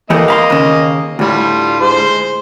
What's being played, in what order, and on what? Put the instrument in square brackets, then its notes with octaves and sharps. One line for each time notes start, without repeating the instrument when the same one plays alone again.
[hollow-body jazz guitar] E3 A3 G4 [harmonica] A#3 D#5
[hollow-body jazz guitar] F5 B5 C6
D#2 C#3
[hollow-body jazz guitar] D2 A2 [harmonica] G3 F4
[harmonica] G#3 C5 C6